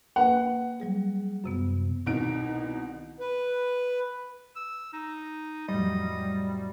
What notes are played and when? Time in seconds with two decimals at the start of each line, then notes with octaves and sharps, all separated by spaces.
0.16 A#3 B4 F#5
0.80 F#3 G3 G#4
1.44 F#2 C3 B3
2.06 C2 B2 D#3 D7
3.20 B4
4.56 E6
4.93 D#4
5.68 F2 A2 F#3 G3 D#5